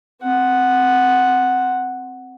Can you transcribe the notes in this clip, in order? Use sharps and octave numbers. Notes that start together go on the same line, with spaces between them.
C4 F#5